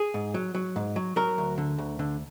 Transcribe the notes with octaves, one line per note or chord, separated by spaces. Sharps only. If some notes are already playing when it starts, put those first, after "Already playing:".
Already playing: G#4
G#2
F#3
F#3
G#2
F#3
F#3 A#4
D2
D3
D2
D3